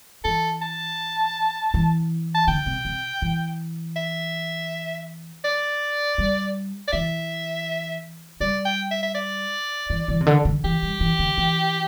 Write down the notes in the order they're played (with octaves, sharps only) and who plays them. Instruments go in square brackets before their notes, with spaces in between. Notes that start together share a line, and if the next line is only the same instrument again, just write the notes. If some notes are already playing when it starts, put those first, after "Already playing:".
[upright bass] E3 [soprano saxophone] A4
[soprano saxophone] A5
[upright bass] E3
[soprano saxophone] A5
[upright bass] D3 [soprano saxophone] G5
[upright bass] C3
C3
E3
[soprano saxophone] E5
D5
[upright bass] G3
[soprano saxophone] D5
[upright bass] E3 [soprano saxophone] E5
[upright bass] G3 [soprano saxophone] D5
[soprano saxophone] G5
E5
E5
D5
[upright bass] E3
E3
C3
D3
D3
[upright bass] E3 [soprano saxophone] G4
[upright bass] G3
E3
D3
E3